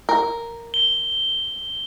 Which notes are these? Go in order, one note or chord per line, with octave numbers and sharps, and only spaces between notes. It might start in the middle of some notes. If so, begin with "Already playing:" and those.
A#4
G7